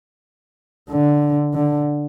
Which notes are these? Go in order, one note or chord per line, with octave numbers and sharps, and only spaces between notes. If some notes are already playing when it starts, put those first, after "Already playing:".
D3
D3